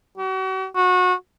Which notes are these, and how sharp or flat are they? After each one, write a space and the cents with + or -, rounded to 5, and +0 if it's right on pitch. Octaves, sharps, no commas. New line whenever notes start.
F#4 +40
F#4 -25